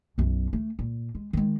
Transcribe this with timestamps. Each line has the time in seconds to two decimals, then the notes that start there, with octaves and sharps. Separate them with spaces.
0.18 B1 F#2
0.53 A3
0.79 A#2
1.15 G#3
1.33 D#3 G#3